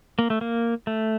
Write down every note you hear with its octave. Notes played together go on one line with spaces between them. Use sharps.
A#3
A3
A#3
A3